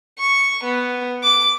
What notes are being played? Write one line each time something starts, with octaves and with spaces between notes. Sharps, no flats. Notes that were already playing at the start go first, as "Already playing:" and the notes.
C#6
B3
D6